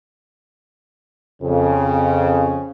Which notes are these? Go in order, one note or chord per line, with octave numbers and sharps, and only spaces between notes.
F2 C#3